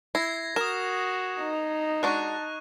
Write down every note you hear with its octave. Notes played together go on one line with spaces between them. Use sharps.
E4 G#6 A#6 C7
F#4 A#4 D#6 E7
D#4
G#3 D4 F#4 A5 C#6 F#6